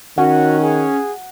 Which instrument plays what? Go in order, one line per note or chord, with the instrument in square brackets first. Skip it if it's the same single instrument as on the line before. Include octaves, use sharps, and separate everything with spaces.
[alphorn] D#3 [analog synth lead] C#4 [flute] F#4 [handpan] F#5
[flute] G#4